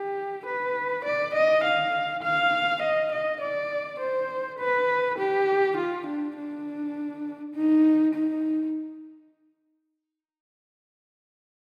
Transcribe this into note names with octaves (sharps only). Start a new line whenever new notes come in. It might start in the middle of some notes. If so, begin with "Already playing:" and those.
Already playing: G4
B4
D5
D#5
F5
F5
D#5
D#5
D5
C5
B4
G4
F4
D4
D4
D#4
D#4